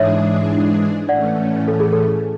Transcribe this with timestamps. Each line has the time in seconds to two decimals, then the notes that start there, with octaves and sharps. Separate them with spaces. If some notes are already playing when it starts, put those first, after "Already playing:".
Already playing: G#2 E3 G#3 D4 G#4 C#5 E5
1.09 A2 E3 A3 C#4 D5 F#5
1.68 A4
1.80 G#4
1.92 A4